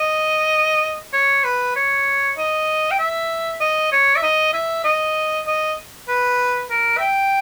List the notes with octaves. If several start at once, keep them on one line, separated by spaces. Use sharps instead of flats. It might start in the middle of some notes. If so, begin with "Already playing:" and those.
Already playing: D#5
C#5
B4
C#5
D#5
G5
E5
D#5
C#5
E5
D#5
E5
D#5
D#5
B4
A#4
E5
G5